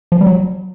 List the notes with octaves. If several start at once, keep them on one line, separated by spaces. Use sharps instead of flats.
F3
G3
F#3